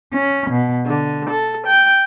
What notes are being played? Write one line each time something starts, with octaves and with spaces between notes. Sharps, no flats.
C#4
B2
D3
A4
G5